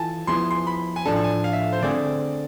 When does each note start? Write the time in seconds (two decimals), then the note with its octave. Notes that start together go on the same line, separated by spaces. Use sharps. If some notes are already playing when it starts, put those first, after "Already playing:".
Already playing: E3 F4 A4 G#5 A5
0.27 F3 B3 E4 G#4 C6
0.51 C6
0.67 B5
0.96 G#5
1.05 A2 F3 A3 D4 A4 A5
1.16 A5
1.24 G#5
1.44 F5
1.53 E5
1.73 C5
1.82 D3 A3 C4 G#4 D5